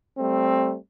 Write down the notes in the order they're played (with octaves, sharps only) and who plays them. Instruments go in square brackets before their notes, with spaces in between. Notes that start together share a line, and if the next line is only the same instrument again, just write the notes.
[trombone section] G3 A3 C4